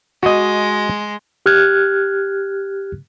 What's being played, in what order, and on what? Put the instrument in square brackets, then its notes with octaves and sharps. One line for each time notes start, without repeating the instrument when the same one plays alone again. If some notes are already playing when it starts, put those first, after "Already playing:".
[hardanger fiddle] G#3 [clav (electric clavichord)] F#4 D#5
[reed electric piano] G4 F6 F#6 G#6